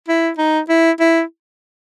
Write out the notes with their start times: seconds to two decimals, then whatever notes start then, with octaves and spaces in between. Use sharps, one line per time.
0.08 E4
0.38 D#4
0.69 E4
1.00 E4